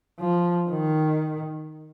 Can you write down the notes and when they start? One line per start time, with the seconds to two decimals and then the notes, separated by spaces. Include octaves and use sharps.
0.20 F3
0.70 D#3